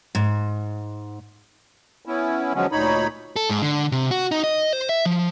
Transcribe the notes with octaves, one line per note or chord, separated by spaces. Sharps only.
G#2
B3 C#4 E4
D3 F3 F#3 G#3 B3 C#4
D2 A#2 D#4 C#5 B5
A4
G#2
D3
C3
F#4
D#4
D#5
C5
E5
F3